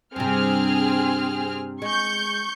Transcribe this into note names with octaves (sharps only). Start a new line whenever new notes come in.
G2 C3 C4 G#4 F6
G#3 C#6 G6